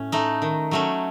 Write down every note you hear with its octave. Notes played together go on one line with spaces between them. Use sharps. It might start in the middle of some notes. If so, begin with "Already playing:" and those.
Already playing: A2 C#4
A3 D#4
D#3
F#3 A3 C#4